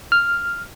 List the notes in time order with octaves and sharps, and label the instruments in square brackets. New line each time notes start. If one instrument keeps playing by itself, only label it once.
[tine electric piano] F6